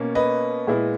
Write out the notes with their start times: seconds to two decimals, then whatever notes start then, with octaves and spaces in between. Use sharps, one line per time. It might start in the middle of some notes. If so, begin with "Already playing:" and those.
Already playing: B2 A#3 C#4
0.15 B4 D#5
0.67 A#2 G#3 B3 E4